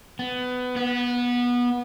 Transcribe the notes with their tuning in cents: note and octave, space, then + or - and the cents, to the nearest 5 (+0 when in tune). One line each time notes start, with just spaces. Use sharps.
B3 +20
B3 -20